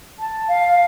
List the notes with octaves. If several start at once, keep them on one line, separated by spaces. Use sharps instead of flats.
A5
F5